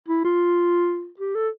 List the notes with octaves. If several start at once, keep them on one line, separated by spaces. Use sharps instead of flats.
E4
F4
G4
A4